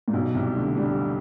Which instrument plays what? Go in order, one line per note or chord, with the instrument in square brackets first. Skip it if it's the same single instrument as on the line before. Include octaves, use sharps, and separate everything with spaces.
[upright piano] A#2
B1 B2
C2 C3
D2 D3
G2 G3